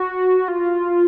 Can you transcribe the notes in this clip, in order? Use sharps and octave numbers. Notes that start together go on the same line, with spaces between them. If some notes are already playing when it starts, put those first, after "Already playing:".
Already playing: F#4
F4